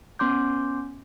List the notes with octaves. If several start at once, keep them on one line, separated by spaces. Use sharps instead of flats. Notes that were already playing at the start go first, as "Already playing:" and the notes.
B3 C#4 C6 D6 G6